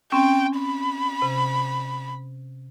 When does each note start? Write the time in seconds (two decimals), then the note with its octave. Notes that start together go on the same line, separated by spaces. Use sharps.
0.12 C4 C#4 G5
0.58 B5
1.22 C3